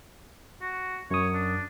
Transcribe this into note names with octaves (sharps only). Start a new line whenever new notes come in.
F#4
F#2 C#5 D#6
D4